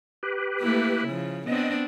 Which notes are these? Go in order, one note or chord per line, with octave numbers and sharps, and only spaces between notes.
G4 B4
A3 A#3 E4
C#3 F3
B3 C4 D4 D#5